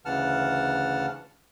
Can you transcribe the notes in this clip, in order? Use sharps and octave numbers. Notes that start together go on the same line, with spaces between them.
D2 C#3 E3 F#5 A5 F6